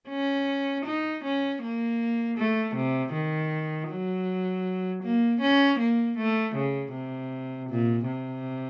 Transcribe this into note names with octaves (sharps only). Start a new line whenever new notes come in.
C#4
D#4
C#4
A#3
A3
C3
D#3
F#3
A#3
C#4
A#3
A3
C#3
C3
A#2
C3